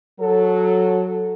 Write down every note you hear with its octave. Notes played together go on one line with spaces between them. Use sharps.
F#3 A4